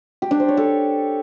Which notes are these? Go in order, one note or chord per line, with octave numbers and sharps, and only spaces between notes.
G4
D4
C5
C#5
A4